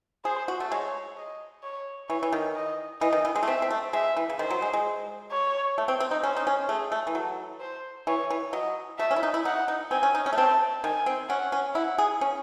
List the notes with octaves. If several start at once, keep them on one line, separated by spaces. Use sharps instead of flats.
G#4 C5
F#4
A3
G#3 C#5
D#5
C#5
E3 C#5
E3
D#3
D#5
E3 D#5
D#3
E3
G#3
A3
C4 E5
C4
A3
G#3 E5
E3
C#3
D#3 C5
F#3
G#3
G#3
C#5
A3
C4
C4
D#4
C#4 C5
D#4
C#4
A3 G#4
A3
E3
F#3 A4
C5
E3 C#5
E3
F#3 D#5
A3 E5
C#4
E4
D#4
E4
D#4 F#5
D#4
C4 G#5
C#4
D#4
C#4
A3
C4 A5
D#3 G#5
C4
C#4 F#5
C#4
E4 F#5
G#4
C#4